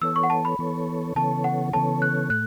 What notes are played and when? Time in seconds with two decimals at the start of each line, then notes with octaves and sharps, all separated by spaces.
0.02 E3 B3 A4 C#5 E6
0.16 C#6
0.23 F#5
0.30 A5
0.45 B5
0.59 E3 B3 A4 C#5
1.15 C#3 E3 B3 A4 C#5 A5
1.44 F#5
1.73 C#3 E3 B3 A4 C#5 A5
2.02 F#6
2.30 A2 A3 F#6